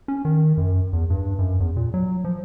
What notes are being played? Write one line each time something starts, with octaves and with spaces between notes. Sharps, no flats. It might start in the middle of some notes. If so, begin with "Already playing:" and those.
C#4
D#3
F#2
E2
G2
F#2
E2
A#2
F#3
F3